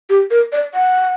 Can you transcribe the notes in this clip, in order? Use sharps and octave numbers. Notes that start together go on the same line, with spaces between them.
G4
A#4
D5
F#5